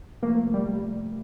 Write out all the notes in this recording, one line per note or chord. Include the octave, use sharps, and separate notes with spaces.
C3 F3 A3 A#3
G3